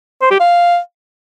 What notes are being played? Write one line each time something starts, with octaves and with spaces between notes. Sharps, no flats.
C5
G4
F5